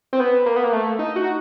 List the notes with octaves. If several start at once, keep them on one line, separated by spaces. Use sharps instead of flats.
C4
B3
A#3
B3
A#3
A3
D#4
F#4